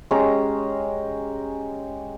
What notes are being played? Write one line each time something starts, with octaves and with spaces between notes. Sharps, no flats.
G#3 C#4 G4 A#5